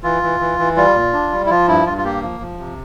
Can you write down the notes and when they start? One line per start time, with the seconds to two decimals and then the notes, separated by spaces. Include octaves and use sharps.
0.03 E3 F4
0.23 E3
0.40 E3
0.59 E3
0.76 G3 F4
0.95 A#2
1.13 D4
1.32 G3
1.46 E4
1.50 F3 F4
1.67 G2 E4
1.86 G2 F4
1.98 F4
2.04 A#3 G4
2.23 F3
2.40 F3
2.59 C3